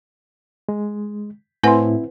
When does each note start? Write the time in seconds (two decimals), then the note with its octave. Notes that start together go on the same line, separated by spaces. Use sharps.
0.69 G#3
1.63 A2 C4 E4 B4 C5 F#5 G#5 C6